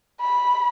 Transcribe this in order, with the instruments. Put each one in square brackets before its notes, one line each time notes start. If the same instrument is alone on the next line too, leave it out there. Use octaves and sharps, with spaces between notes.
[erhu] B5